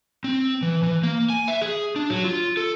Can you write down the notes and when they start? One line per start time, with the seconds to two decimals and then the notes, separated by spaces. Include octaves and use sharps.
0.24 C4
0.62 E3
0.83 E3
1.03 A#3
1.30 G#5
1.48 E5
1.61 G#4
1.96 D4
2.10 F#3
2.24 F4
2.57 A4